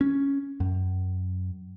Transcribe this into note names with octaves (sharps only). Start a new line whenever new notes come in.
C#4
F#2